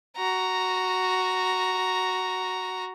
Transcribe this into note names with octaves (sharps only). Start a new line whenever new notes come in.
F#4 A#5